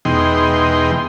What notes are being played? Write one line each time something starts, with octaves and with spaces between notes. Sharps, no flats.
E2 B2 G#3 D#4 G5 C6